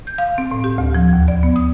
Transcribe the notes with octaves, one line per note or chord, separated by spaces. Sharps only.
G6
F5
C4
A2
G4
D2
F3
D#2
D5
B3
D#6